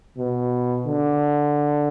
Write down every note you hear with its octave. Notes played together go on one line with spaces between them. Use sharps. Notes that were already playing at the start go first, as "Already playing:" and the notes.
B2
D3